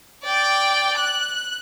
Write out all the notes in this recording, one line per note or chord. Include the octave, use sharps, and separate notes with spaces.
D5 G5
F#6